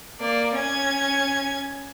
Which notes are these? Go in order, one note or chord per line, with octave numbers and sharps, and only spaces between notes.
A#3 D5
C#4 G#6